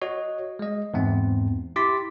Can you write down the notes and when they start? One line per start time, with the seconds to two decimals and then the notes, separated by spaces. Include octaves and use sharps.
0.02 F#4 C#5 D#5
0.59 G#3 D#5
0.94 E2 G#2 C4
1.76 E4 G4 C6 D6 A6 B6